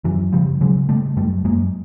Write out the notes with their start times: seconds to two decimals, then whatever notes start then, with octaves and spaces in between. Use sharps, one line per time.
0.04 F#2 E3 F#3
0.33 C#3 F3 G3
0.61 C#3 F#3 G#3
0.89 C#3 G3 A3
1.17 F#2 G3 A3
1.44 F#2 G#3 A#3